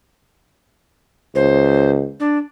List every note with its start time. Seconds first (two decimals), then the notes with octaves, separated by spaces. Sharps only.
1.35 C#2 C5
2.20 D4